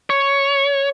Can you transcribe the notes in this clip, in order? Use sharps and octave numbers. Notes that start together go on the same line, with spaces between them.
C#5